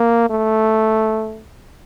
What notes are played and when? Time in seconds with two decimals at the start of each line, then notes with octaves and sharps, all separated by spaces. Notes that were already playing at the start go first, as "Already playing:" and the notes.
Already playing: A#3
0.30 A3